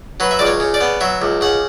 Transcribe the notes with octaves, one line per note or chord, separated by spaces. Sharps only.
F#3 B4
E5
C#2 D5
C#5
C#3
D5
B3
F#3 E5
C#2
C#3 F#5